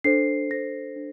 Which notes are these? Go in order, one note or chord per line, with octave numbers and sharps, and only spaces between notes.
D4 A4 C5 C7
D4 A4 C5 A#6
D4